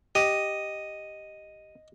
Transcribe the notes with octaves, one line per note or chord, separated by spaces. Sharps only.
G4 D#5 D#7